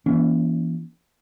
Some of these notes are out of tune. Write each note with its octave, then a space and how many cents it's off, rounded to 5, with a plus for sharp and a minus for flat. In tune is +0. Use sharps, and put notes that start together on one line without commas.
E3 +20 A#3 +40 C#4 +35